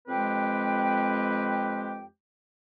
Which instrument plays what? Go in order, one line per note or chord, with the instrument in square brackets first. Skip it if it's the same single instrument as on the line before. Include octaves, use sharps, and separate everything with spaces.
[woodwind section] F2 G#3 C4 G4 B4 G5